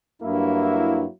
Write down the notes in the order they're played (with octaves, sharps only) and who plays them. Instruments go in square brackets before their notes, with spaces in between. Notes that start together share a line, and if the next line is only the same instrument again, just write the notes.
[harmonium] G2 [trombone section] F#3 A#3 E4